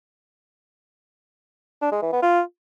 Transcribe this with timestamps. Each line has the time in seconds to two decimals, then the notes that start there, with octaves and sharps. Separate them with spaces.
1.82 D4
1.92 G#3
2.02 E3
2.12 B3
2.22 F4